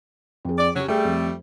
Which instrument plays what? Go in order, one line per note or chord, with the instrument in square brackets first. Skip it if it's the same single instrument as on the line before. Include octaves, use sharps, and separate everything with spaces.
[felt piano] F2 G#4
[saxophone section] D5
[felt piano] C#3 G4 [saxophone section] F#3 C#4
[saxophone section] G3 A3 [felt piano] G#4 G5
[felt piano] F2